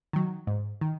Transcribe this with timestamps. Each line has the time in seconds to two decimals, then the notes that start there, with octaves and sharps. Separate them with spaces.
0.13 D#3 F#3
0.47 G#2
0.81 D#3